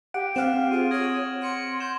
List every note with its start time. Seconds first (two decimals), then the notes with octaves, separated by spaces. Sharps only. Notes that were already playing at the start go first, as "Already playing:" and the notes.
0.14 G4 F#5 D7
0.36 C4 F5 F#5 F6 E7
0.71 F4 G#4 D#7
0.91 C#5 D#6 G#6 A#6 F#7
1.43 C6 C#7
1.80 G6 E7